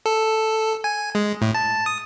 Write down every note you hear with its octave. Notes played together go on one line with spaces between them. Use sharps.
A4
G#5
G#3
A2
A5
D#6